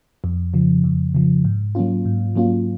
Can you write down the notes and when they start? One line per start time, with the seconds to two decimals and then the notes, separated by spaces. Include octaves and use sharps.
0.24 F2
0.54 C#3 F3
0.84 F2
1.15 C#3 F3
1.45 G#2
1.75 F#3 A#3 C#4 F4
2.05 G#2
2.35 F#3 A#3 C#4 F4